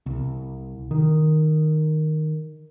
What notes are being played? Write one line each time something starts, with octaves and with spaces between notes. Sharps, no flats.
C2
D#3